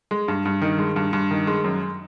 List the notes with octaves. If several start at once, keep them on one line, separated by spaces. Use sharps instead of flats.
G#3
G2
G2
D#3
G#3
G2
G2
D#3
G#3
F#2